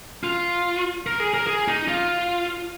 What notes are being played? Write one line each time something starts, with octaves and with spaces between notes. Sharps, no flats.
F4
A#4
G#4
A#4
G#4
D#4
F4